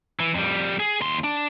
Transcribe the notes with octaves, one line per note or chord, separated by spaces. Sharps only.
E3
F2 G3
G#4
D#2 C6
D4